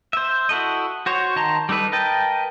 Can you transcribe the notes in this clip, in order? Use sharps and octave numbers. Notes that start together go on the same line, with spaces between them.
C5 E5
E4 F#4 A4 D#5
F#4 C5 C#5
D#3 D#5 A5 A#5 C6
G3 D#4 A4 B4
A#4 B4 D#5 G5 A5